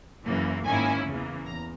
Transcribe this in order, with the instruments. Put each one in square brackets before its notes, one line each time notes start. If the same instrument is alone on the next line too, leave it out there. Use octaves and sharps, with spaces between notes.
[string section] F#2 C#3 E3 A#3
G#2 D#3 A#3 C#4 E4 G#5
E2 C#3 E3 A#3
E2 A#5